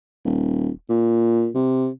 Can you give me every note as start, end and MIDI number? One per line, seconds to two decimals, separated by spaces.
0.25 0.70 27
0.89 1.49 46
1.55 1.89 48